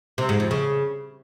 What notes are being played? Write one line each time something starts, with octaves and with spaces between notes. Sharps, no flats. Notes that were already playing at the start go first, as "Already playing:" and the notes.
C3
G#2
F2
C#3